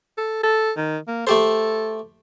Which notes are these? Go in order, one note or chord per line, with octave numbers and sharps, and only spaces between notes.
A4
A4
D#3
A#3
A3 G4 A4 C5